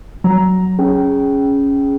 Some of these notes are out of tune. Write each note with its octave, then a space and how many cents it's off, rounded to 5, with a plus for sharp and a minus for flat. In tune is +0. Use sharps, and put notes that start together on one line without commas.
F#3 +0 A#5 +5
C#4 +0 G#4 +0 G5 -25